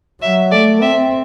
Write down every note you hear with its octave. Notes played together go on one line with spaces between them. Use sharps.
F#3 E5
A3 D5
C4 E5